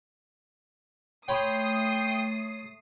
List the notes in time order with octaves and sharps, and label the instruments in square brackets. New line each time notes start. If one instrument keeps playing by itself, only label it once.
[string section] A3 D#6 C7 [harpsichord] C#5 B5 C6 [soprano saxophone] G5